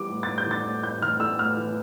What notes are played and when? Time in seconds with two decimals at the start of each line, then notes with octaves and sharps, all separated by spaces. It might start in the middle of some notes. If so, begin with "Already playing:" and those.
Already playing: E3 G3 D6
0.09 A2
0.23 A2 A6
0.38 G6
0.46 E3 A6
0.65 A2
0.83 A2 G6
1.02 E3 F6
1.20 E3 E6
1.39 A2 F6
1.57 E3